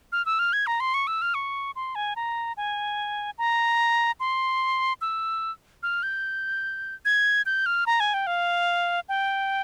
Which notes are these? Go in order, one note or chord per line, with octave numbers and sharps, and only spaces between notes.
F6
E6
F6
G#6
A#5
C6
C#6
E6
F6
C#6
C6
G#5
A#5
G#5
A#5
C6
E6
F6
G6
G#6
G6
F6
A#5
G#5
G5
F5
G5